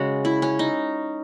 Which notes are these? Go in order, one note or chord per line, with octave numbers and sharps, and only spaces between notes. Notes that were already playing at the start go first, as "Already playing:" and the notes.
Already playing: C#3 G#3 F#4
E4
C#4
D#4